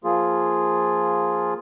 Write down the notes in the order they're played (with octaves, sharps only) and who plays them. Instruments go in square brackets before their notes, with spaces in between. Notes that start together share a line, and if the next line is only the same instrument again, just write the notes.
[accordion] F3 A#3 F4 G#4